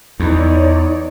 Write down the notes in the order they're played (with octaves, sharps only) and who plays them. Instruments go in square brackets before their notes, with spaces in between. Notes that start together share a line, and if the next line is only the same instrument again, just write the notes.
[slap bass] E2 [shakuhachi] D#4 [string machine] C#5 D5